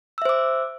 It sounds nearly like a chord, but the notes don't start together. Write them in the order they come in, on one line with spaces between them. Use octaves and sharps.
E6 E5 C5 D6